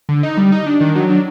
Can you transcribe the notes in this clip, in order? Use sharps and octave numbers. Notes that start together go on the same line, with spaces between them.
D3
D#4
G3
D#4
D4
D#3
F#3
D4